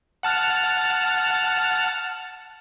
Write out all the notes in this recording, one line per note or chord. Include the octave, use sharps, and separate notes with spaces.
F#5 A5 F6